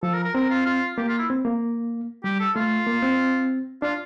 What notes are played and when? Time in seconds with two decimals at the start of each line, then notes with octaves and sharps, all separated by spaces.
0.03 F3 A4
0.13 A#4
0.24 A#4
0.35 C4 A#4
0.50 F4
0.66 F4
0.98 A#3 G4
1.08 F4
1.19 E4
1.30 C4
1.45 A#3
2.24 G3 G4
2.40 A4
2.56 A3 F4
2.87 A#3
3.02 C4
3.82 D4 F4